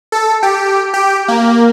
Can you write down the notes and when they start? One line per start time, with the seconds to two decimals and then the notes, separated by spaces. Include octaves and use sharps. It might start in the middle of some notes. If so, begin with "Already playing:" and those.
0.12 A4
0.43 G4
0.94 G4
1.28 A#3